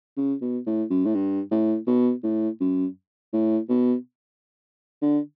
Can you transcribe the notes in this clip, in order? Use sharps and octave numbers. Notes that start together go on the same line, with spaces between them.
C#3
B2
A2
F#2
A2
G2
A2
B2
A2
F#2
A2
B2
D3